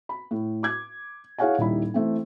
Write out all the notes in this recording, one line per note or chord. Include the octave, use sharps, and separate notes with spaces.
B5
A2
D6 G#6
E4 G#4 C#5 F5 F#5 G#5
D#1 G3 D#4 E4 B5
E3 A3 C4